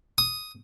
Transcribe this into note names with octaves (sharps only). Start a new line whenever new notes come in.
D#6